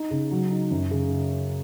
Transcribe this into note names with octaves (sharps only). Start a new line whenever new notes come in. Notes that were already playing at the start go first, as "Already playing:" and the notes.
Already playing: D#4
C#3
F#3
D#4
F#2
C#3